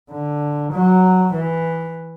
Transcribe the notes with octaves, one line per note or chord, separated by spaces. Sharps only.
D3
F#3
E3